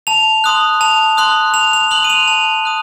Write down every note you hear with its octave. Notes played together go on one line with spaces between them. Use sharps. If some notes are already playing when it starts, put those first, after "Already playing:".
A5 F7
C6 D#6 F#6
A5 F7
C6 D#6 F#6
A5 F7
F7
C6 D#6 F#6 F#7
D#7
F7
A5 F7
D#6 F#6